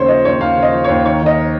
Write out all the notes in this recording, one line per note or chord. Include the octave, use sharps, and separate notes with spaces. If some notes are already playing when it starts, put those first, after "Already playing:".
Already playing: D#2 C#3 C5 C#5
F3 D#5
D#2 C#5
D#2 F5
C#3
D#5
F3
D#2 C#5
D#3 C#5
D#3 D#5